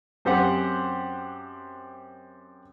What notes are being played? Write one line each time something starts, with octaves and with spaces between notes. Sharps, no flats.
F#2 C4 G4 C5 F#5